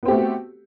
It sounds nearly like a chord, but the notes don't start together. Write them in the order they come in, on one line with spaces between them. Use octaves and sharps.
B3 C4 G4 A3 F#4